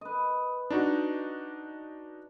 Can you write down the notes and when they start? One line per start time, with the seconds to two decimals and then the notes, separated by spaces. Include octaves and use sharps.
0.01 B4 D#5
0.70 D4 D#4 F#4